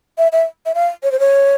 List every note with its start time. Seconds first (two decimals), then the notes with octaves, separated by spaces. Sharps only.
0.18 E5
0.32 E5
0.66 E5
0.75 F5
1.03 C#5
1.12 C5
1.20 C#5